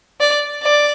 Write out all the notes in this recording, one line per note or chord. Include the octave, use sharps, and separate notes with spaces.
D5
D5